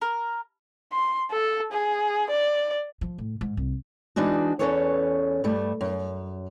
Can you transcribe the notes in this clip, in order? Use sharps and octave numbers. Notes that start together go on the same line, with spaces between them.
A#4
C6
A4
G#4
D5
F3
A2
G#2
C2
E3 G#3 D4 D#4 F#4
E2 G#2 C#4 A4 B4 C#5
G2 G3 A3
F#2